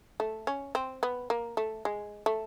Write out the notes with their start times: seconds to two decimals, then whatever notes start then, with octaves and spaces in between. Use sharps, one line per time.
0.20 A3
0.47 C#4
0.75 C4
1.03 B3
1.30 A#3
1.57 A3
1.85 G#3
2.26 A3